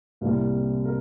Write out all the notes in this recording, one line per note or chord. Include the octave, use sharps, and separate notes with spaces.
C2 C3 G3 A#3
A#4